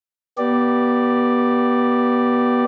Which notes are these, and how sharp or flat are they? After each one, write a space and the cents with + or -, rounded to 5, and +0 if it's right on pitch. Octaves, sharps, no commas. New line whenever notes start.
B3 -25 G4 -20 D5 +5